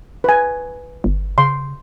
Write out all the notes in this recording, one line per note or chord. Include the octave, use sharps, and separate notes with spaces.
B4 G#5
G1
C#3 C6